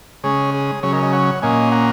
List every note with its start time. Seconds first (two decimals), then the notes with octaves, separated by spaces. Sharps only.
0.24 C#3 G#3 C#4 G#4 C#5
0.54 G#4
0.83 C#3 F#3 C#4 G#4 C#5
0.93 A#4 D#5
1.03 D#5 G#5
1.13 C#5 F#5
1.42 A#2 A#3 C#4 D#5 G#5
1.72 F#5 A#5